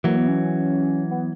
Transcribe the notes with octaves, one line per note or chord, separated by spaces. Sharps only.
E3 F#3 A#3
B3
C#4
B3